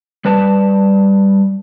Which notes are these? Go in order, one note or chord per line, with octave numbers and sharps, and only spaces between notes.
G3 B4 D5 A5